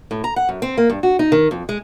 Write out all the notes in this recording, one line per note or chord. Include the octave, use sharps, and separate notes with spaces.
A2
A#5
F#5
F#2
C4
A#3
G2
F#4
D#4
D#3
F2
G#3